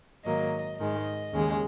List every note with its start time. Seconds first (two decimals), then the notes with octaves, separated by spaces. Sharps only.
0.24 G#2 D#3 F#3 A#3 D#5
0.79 G#2 D#3 G#3 D#5
1.33 D#2 C#3 G#3